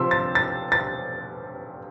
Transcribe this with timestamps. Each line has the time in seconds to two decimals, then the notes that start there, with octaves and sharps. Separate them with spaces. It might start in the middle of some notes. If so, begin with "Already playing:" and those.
Already playing: C3 F3 C6 E6
0.11 A6
0.35 A6
0.72 A6